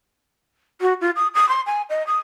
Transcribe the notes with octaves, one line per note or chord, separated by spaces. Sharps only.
F#4
F4
D#6
D#6
C6
G#5
D#5
D#6